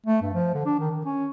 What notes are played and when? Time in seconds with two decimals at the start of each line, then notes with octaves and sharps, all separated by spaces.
0.07 A3
0.22 G2
0.34 F3
0.54 D3
0.66 D4
0.80 D#3
0.91 D#3
1.05 C#4